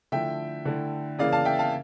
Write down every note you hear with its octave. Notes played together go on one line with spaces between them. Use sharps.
D3 F3 A3 E4 E5 G5
D3 A3 E4
C#3 E3 A#3 D5 F5
F5 A5
E5 G5
F5 A5